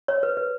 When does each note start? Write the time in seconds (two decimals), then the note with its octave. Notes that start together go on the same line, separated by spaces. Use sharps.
0.08 C#5
0.23 B4
0.37 B4